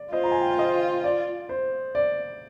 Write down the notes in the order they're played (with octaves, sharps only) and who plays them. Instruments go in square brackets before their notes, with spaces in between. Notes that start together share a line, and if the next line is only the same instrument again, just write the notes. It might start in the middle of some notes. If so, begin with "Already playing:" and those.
Already playing: [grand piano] D5
[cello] F4 [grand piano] C5 D#5
[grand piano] A#5
G#5
G5
F5
C5 D#5
D5
C5
D5